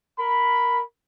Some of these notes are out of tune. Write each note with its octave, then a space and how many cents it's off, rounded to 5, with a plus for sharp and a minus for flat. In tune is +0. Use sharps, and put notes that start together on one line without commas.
A#4 +0 B5 +0